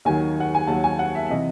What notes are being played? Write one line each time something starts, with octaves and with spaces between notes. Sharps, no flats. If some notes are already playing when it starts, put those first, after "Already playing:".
D#2 D#3 F#3 G#5
F#5
G#5
D#2 D#3 F#3 A5
G#5
F#5
E5
E5
C3 E3 D#5